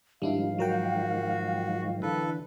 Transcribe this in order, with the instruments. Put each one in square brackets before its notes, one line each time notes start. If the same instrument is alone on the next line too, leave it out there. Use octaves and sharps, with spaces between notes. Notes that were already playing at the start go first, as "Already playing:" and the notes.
[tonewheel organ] G#2 D#3 F3 [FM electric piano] G3 D4 E4 [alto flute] F5
[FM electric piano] F#3 A#4 G5 [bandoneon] F#4
[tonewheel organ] D3 E3 [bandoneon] A4 B4